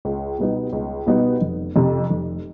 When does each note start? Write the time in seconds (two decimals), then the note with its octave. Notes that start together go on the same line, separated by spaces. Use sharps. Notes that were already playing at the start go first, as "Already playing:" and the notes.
0.05 C#2
0.39 B2 G3 B3 D#4
0.73 C#2
1.07 B2 G3 B3 D#4
1.41 F1
1.76 F2 C3
2.10 F1